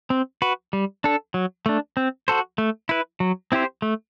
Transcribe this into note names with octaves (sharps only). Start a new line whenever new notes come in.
C4
F#4 B4
G3
D4 A4
F#3
A3 D4
C4
F#4 A4 C5
A3
E4 B4
F#3
C4 E4 G4 C5
A3